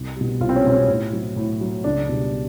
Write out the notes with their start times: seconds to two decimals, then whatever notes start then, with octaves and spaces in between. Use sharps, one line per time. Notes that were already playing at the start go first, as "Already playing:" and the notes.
Already playing: C2
0.16 B2 G3
0.41 C2 F4
0.49 C4
0.56 C#4
0.64 B2 G3 C4
0.72 C#4
0.88 A2
1.13 F#3
1.36 A2
1.61 F#3
1.84 C#2 D4
2.09 B2 G3